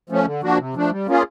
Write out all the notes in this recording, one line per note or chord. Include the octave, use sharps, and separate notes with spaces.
F3 A3 C#4
D3
F3 A#3 D4 F#4
C3
F3 A3 D4
G3
A#3 C#4 F4 G#4